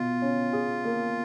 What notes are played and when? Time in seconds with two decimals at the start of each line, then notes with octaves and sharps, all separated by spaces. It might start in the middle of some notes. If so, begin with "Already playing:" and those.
Already playing: B2 F4
0.22 C#4
0.53 G#4
0.85 A#3